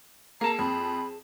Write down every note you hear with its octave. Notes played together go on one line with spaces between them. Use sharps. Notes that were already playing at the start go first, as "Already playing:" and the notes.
A#3 G#4 A5 A#5
F2 B5